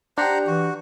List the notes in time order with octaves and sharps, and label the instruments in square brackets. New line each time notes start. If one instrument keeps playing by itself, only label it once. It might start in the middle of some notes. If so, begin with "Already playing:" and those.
[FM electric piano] D4 G4 [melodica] C5 F#5 A#5
[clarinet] E3 [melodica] F#4